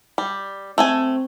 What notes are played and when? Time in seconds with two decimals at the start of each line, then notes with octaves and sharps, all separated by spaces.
0.18 G3
0.78 A3 C4 A4 G#5